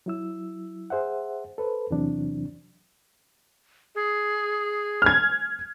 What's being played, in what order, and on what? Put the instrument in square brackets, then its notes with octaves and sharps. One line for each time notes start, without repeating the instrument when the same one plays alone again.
[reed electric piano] F#3 E4 E6
G#4 C5 E5 F#5
A4 B4 C5
E2 C3 E3 F#3 C4 D4
[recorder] G#4
[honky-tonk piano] F6 G#6